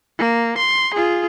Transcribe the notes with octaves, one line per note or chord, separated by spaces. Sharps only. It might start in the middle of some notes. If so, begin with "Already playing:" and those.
A#3
C6
F4 G#4